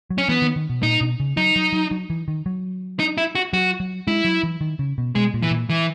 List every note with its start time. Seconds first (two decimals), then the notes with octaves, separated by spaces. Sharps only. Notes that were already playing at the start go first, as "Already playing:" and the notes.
0.10 F#3
0.18 C#4
0.28 E3 B3
0.42 D#3
0.56 D#3
0.69 B2
0.83 A#2 D#4
1.01 B2
1.20 C#3
1.37 F#3 D#4
1.56 F#3
1.73 F#3
1.91 F#3
2.10 E3
2.28 D#3
2.46 F#3
2.99 D#4
3.18 E4
3.35 F#4
3.53 F#3 F#4
3.80 F#3
4.07 G#3 E4
4.25 F#3
4.43 E3
4.61 D#3
4.79 C#3
4.98 B2
5.15 B2 G#3
5.34 A#2
5.43 E3
5.51 A#2
5.69 E3